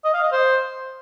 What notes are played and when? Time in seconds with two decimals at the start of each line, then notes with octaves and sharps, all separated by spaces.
0.05 D#5
0.14 F5
0.23 D#5
0.32 C5